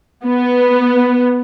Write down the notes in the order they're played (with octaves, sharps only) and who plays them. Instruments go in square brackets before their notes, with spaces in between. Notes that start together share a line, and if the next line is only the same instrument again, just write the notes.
[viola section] B3